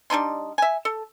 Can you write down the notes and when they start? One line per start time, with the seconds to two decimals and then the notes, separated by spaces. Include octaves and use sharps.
0.10 G3 D4 D#4 C6
0.58 E5 G#5
0.85 A4